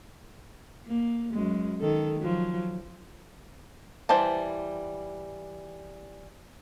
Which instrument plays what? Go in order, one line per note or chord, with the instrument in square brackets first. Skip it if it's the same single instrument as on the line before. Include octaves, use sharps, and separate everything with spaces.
[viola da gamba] A#3
F#2 G#3
D#3 A4
F3 F#3
[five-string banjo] E3 G3 C5 A5